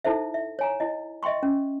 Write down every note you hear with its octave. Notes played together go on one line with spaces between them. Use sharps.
D#4 E4 A4 C5 E5
E5
C#5 G#5 A#5
E4 D#5
D#5 E5 G5 C6 C#6
C#4